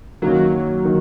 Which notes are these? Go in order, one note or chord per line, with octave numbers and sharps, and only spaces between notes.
F#2 D#3 F#3 A#3
D#3